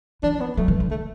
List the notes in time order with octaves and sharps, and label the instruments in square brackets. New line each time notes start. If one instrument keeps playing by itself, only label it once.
[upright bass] E3 [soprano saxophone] D4
[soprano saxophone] D4
B3
[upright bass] F#3 [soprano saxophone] A3
[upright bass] E3
D3
[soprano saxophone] A3